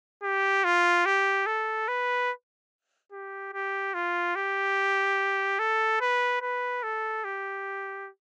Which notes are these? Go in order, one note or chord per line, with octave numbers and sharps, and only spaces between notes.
G4
F4
G4
A4
B4
G4
G4
F4
G4
A4
B4
B4
A4
G4